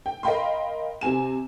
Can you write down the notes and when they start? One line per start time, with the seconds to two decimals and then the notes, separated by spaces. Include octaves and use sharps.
0.06 G5
0.23 A#4 D#5 F5 G5 B5 C6
1.01 C3 C4 G#5 E7